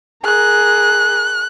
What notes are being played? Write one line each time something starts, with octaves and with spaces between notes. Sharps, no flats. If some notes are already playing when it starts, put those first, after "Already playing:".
G#4 A#4 F#6